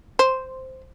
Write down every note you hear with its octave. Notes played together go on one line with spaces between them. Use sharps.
C5